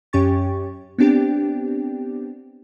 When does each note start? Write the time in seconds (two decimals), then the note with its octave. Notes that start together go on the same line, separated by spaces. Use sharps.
0.13 F#2 C#4 G4 G5 C#6 A6
0.98 B3 C4 D4 G4 G5